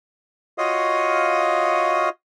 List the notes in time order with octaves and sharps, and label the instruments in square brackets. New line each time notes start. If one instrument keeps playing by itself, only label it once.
[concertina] F4 F#4 C#5 D#5 F5 D#6